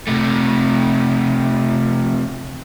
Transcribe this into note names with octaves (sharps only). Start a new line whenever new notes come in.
C3 A3